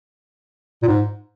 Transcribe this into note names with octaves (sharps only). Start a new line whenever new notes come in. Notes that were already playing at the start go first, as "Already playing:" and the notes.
A#2
G#2